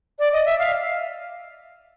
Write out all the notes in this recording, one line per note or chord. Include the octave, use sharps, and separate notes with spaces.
D5
D#5
E5
F5